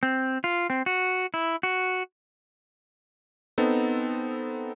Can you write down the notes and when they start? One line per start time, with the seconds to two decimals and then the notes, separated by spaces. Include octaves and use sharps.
0.03 C4
0.44 F4
0.70 C4
0.86 F#4
1.34 E4
1.63 F#4
3.58 B3 C4 D#4 A4